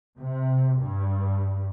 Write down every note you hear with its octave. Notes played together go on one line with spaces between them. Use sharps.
C3
G2